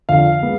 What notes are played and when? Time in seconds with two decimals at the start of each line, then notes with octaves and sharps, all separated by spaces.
0.09 F2 D3 F3 F5
0.41 G#3 B3